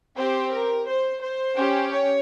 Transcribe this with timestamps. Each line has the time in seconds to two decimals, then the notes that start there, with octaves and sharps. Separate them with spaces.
0.16 C4 G4 C5
0.51 A#4
0.86 C5
1.21 C5
1.56 C#4 G4
1.91 C#5